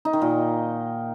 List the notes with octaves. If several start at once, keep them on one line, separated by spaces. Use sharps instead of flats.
D#4
D#3
A#2